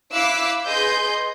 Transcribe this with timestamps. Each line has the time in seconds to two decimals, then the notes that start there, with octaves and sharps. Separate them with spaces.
0.14 E4 E5 F5 D6 E6 F#6
0.66 G#4 B4 D#5 C6 G6